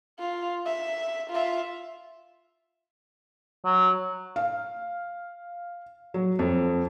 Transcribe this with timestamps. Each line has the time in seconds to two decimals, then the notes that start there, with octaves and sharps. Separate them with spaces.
0.19 F4
0.66 E5
1.30 F4 E5
3.65 F#3
4.36 F5
6.14 F#3
6.39 F2